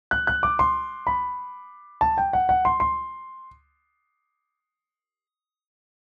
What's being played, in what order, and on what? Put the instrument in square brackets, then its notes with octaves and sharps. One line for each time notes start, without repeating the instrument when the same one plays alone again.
[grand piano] F#6
F#6
D6
C6
B5
A5
G5
F#5
F#5
C6
C6